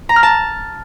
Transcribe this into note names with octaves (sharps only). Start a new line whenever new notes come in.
A#5
F6
A5